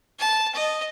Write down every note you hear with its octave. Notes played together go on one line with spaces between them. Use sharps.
A5
D#5